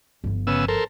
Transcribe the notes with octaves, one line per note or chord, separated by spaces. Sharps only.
G1 F3
C#3 B3 E6
A4 A#4 C5